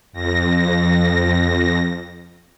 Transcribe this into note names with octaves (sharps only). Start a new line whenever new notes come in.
F2 A#6